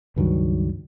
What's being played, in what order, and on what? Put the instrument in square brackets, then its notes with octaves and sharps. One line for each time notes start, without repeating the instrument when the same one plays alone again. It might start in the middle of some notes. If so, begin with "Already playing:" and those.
[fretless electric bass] C#2 G2 D#3 F#3